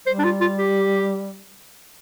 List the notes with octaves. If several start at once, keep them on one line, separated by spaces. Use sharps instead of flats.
G3 C5
D4
F4
F4
G4